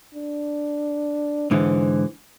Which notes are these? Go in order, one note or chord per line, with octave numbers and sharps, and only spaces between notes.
D4
G#2 D3 E3 C5